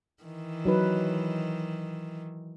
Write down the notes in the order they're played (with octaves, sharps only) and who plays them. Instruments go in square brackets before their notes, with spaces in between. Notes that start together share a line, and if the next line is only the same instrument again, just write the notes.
[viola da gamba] D#3 E3
[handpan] F#3 D#4 B4